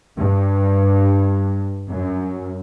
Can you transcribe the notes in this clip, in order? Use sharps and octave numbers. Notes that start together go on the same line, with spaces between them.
G2
F#2